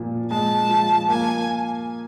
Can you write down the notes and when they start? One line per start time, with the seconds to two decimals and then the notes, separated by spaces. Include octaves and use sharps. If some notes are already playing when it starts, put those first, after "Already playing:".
Already playing: A#2 F3
0.30 G#3 A5
0.70 F3
1.08 A#3 G#5